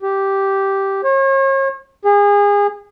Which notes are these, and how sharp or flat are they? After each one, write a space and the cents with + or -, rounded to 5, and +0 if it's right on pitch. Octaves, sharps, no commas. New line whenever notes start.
G4 -5
C#5 -40
G#4 -30